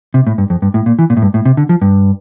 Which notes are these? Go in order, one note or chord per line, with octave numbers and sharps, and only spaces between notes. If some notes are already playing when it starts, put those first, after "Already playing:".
C3
A2
G2
F2
G2
A2
A#2
E3
A#2
A2
G2
A2
C3
D3
F3
G2